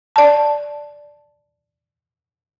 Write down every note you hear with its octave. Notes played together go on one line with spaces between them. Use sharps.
D5 A5